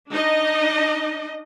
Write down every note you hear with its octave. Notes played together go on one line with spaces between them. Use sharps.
D4 D#4 D#5